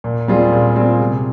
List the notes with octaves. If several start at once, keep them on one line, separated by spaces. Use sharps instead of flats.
A#2
G3 C4 F4 G#4
A#2
G3 C4 F4 G#4
C3